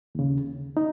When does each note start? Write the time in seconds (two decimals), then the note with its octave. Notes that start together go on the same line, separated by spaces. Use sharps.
0.15 D#2 C#3
0.77 D#4